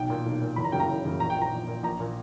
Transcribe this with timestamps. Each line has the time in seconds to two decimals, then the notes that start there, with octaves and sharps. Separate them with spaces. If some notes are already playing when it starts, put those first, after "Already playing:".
Already playing: B1 G5
0.10 A#2
0.26 B1
0.42 A#2
0.56 F#1 B5
0.64 A#5
0.72 F#2 C#3 E3 G5
0.80 A#5
0.89 F#1
1.05 F#2 C#3 E3
1.20 A#1 A#5
1.30 G5
1.37 A#2 A#5
1.52 A#1
1.67 A#2
1.83 A#1 A#5
2.00 A#2